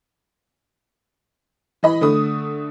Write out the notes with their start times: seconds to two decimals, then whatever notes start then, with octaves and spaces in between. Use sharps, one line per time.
1.83 E3 D#5 B5
2.01 D3 A3 D#6